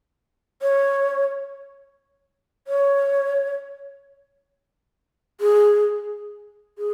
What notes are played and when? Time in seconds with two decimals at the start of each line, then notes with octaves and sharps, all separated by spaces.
0.62 C#5
2.68 C#5
5.41 G#4
6.78 G#4